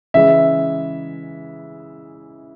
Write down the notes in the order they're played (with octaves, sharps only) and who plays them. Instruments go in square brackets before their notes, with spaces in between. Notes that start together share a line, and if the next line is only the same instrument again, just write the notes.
[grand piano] C#3 E3 G#3 E5